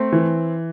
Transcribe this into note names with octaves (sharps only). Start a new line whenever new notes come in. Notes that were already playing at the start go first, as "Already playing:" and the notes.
Already playing: A3 C4
E3